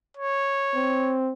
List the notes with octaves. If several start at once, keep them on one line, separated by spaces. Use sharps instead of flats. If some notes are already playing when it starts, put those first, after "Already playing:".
C#5
C4